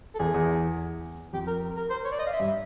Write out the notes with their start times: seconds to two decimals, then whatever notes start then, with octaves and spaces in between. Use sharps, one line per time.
0.15 A4
0.19 E2 G#4
0.34 E2
1.33 F2 G4
1.47 A#4
1.76 A#4
1.90 C5
2.05 C#5
2.12 D5
2.19 D#5
2.27 F5
2.33 E5
2.40 G2